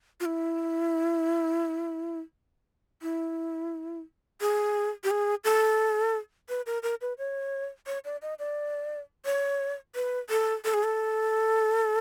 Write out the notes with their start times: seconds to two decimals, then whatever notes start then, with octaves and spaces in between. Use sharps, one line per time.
0.20 F4
0.26 E4
3.02 E4
4.41 G#4
5.04 G4
5.11 G#4
5.44 A4
6.49 B4
6.66 A#4
6.83 A#4
7.01 B4
7.18 C#5
7.87 C#5
8.05 D5
8.22 D#5
8.39 D5
9.25 C#5
9.96 B4
10.30 A4
10.65 A4
10.74 G#4
10.83 A4